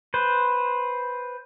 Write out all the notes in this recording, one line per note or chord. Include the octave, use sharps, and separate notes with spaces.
B4 C5